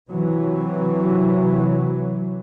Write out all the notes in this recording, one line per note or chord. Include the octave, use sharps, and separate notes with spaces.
C3 E3 F#3